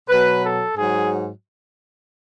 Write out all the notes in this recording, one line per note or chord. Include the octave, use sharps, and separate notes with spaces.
B2 F#3 B4
A4
G#2 F#3 G#4